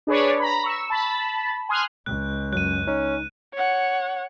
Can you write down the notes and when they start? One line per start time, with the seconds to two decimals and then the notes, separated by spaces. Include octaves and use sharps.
0.07 D4 G#4 B4 C#5 D5
0.40 A#5 B5
0.64 C#6 E6
0.90 A5 B5
1.69 G#5 C6 D#6 F6 F#6
2.06 C#2 F#6
2.53 F#2 F#3 F#6 D#7
2.87 C#4 D#4
3.54 C#5 F#5